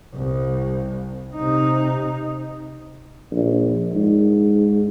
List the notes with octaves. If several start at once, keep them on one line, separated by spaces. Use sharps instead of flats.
C2
C3 D#4
A#1
G#2